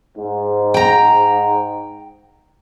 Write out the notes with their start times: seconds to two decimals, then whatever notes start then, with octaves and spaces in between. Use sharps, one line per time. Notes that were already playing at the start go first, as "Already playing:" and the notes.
0.17 G#2
0.74 G5 A#5